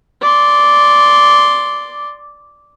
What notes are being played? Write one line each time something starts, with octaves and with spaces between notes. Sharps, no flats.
D5 C6